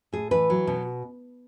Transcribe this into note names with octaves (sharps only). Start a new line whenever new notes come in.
A2 G#4
E3 B4
F#3
B2